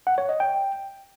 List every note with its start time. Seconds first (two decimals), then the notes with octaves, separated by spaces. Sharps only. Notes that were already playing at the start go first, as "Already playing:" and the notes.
0.07 F#5
0.18 C#5
0.29 D#5
0.40 G5